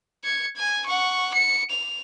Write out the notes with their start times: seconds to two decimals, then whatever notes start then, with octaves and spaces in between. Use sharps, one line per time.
0.24 G#6 C#7
0.56 G#5 G#6
0.86 F#5 C#6
1.34 C#7
1.70 F7